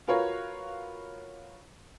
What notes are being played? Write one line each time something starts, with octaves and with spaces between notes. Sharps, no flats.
F4 F#4 A#4 B4 C#5 F5